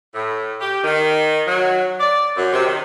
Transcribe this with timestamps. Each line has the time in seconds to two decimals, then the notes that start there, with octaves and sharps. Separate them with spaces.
0.15 A2
0.60 G4
0.84 D#3
1.47 F#3
2.00 D5
2.37 F#2
2.53 C3
2.65 D#3